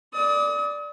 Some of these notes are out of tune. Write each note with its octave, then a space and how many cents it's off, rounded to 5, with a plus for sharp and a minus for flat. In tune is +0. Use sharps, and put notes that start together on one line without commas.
D5 +0 D#6 +40